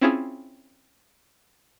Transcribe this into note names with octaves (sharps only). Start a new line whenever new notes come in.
C4 C#4 E4 F4 G#4